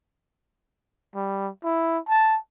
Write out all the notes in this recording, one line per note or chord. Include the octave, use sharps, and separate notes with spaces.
G3
E4
A5